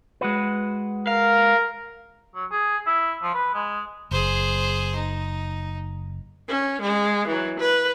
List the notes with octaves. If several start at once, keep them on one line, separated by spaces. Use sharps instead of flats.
G#3 F#4 B4
A#4 F5
F#3
G#4
E4
F3
B4
G#3
F#1 G#4 C5
D#4
C#4
G#3
E3 F#3
B4